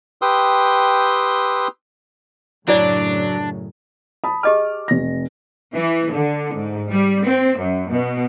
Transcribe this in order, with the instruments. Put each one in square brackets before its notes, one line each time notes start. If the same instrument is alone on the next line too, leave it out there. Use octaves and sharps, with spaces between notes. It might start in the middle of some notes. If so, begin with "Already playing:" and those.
[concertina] G4 B4 G5 C6 D#6 E6
[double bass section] F#2 A2 C#3 [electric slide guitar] F#3 [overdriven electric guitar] D4 [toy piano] E4 D5
[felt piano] A5 B5 D#6
[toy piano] G4 D#5 A5 [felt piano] G#4 D6 F6
[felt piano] F1 A#6
[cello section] E3
D3
G#2
G3
C4
F#2
B2